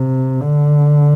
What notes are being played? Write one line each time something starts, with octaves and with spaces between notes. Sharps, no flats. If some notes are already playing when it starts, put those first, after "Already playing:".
Already playing: C3
D3